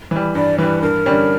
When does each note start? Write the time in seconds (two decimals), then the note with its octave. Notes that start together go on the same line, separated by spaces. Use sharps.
0.11 E3 G3
0.35 G2 D5
0.58 E3 G3 B4
0.82 G2 A#4
1.06 D3 G3 C#4